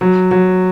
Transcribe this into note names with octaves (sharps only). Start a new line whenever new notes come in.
F#3
F#3